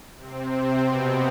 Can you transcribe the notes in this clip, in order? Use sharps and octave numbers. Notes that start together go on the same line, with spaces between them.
C3 C4
B2 B3